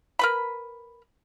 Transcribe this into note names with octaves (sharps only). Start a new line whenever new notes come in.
A#4 B4 B5